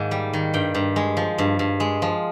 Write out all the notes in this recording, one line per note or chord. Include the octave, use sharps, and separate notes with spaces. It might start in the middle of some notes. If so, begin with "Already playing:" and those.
Already playing: G#2 D#3 A#3
G3
D#3
G2 G5
G2
G#3
F3
G2
G2
G#3
F3